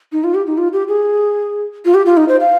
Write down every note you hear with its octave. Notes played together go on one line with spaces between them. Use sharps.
D#4
F4
G4
D#4
F4
G4
G#4
F4
G4
F4
D#4
C5
F5